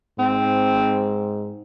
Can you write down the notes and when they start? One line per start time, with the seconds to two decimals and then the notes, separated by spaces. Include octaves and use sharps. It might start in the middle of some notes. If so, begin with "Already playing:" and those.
0.19 G#2 C4